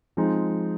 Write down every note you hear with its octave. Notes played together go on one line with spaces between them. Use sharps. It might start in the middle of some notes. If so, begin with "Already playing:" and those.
F3 G#3 C4 D#4